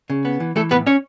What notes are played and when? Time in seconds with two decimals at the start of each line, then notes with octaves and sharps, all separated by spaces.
0.10 C#3
0.25 B3
0.40 E3
0.56 E3 A3 A4
0.71 A2 B3 B4
0.87 C#4 C#5